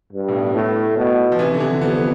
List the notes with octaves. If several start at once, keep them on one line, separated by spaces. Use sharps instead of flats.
G2
A2
B2
A2
B2
F3
C3 E3
D3
C3 E3
F2 G3 B3